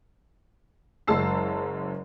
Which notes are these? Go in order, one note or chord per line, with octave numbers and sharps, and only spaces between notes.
F#1 F#2 G#3 A5 E6 C7